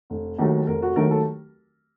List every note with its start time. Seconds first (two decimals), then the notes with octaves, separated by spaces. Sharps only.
0.10 F1
0.38 D#2 D#3 F#3 A3
0.67 F1 A#4
0.82 F#4
0.96 D#2 D#3 F#3 A3 A#4
1.11 A4